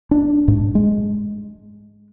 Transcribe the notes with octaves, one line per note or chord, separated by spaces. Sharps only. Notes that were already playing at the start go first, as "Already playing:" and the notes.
D4
G#2
G#3